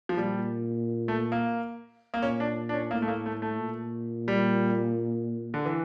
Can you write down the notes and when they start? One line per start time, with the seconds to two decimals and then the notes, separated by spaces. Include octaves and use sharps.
0.09 F3
0.17 A#2 G3
1.08 A3
1.32 A#3
2.14 A#3
2.22 A#2 C#4
2.40 D4
2.69 D4
2.74 C#4
2.91 A2 A#3
3.02 A3
3.08 A#3
3.26 A3
3.42 A3
3.60 A#2
4.28 G3
5.54 D3
5.65 E3